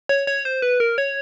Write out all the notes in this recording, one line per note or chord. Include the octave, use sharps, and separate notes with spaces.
C#5
C#5
C5
B4
A#4
C#5